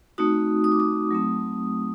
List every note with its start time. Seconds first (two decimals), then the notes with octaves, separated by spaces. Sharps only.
0.18 A3 C4 D#4 F#4 D#6
0.64 D#6
0.72 D6
0.80 D#6
1.11 F#3 A3 C4